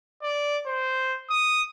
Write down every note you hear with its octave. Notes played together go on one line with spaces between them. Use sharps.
D5
C5
D#6